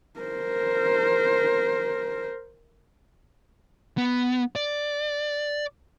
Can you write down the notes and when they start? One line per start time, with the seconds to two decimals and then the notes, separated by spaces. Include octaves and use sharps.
0.20 A#4 C5
3.98 B3
4.56 D5